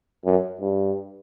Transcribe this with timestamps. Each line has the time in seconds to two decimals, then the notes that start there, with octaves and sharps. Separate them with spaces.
0.25 F#2
0.60 G2